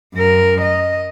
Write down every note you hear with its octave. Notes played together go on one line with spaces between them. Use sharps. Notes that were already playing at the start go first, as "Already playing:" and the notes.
F#2 A#4
D#5